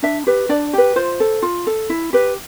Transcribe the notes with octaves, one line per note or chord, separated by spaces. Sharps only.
D4 E5
G4 B4
D4 D5
G4 B4
F4 C5
A4
F4
A4
E4
G4 B4